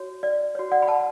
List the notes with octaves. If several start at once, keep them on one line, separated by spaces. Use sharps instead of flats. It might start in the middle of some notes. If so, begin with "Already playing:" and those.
Already playing: F#4 C#5
D5
F#4 C#5
D5 F#5
B5
F#5 A5